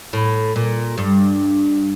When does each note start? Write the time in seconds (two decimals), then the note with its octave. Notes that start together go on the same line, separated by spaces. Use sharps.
0.13 A2
0.56 A#2
0.98 G2